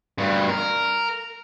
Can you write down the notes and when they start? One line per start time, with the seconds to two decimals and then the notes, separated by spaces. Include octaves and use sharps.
0.18 G2 B2
0.49 A#4